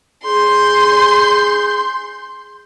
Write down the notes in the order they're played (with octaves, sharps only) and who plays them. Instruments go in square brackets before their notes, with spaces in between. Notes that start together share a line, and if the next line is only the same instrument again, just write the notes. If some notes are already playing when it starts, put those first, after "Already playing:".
[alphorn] G#4 [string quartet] C6 G6